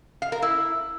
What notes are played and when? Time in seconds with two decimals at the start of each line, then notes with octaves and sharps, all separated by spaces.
0.22 F5
0.32 A#4
0.42 E4